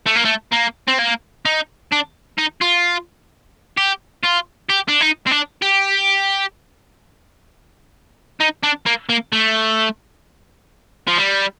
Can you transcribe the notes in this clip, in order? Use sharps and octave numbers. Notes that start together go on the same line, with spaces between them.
A3
A#3
A3
A#3
C4
A#3
D#4
D4
D#4
F4
G4
F4
G4
D4
D#4
C4
D4
G4
D#4
D4
A#3
A#3
A3
F3
G3